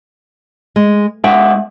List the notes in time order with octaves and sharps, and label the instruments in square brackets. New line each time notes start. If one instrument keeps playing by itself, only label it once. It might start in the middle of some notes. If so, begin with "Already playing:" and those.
[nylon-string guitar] G#3
[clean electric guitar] G#3 E5 F#5 [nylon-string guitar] G5